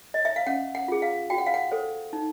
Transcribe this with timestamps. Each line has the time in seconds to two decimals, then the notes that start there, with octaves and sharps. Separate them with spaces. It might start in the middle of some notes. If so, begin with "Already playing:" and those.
0.14 D#5
0.25 E5
0.36 F5
0.47 C#4 F#5
0.75 F#5
0.88 F4 G#4
1.02 F5
1.30 F#4 G5
1.38 F#5
1.46 F5
1.54 F#5
1.71 A4 C5
2.13 D#4